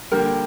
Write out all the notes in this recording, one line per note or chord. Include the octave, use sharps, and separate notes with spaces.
D3 G3 A#3 G4 A#4